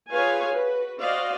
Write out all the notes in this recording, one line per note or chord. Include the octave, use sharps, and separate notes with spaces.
F4 G#4 B4 C#5 F5 G#5
F#4 B4
F#4 C5 D5 D#5 F5